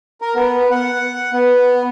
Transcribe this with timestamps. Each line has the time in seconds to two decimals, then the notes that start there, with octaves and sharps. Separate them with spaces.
0.21 A#4
0.36 B3
0.71 F#5
1.33 B3